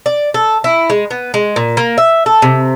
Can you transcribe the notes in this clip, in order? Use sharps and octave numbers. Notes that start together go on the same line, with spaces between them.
D5
A4
E4
G#3
B3
G#3
A#2
A#3
E5
A4
C3